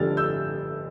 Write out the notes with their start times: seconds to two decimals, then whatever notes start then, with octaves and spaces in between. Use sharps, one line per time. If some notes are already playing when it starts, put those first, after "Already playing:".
Already playing: F1 F2 D3 G3 F6 A6
0.17 E6 G6